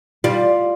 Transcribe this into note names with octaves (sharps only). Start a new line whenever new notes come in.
G3 F4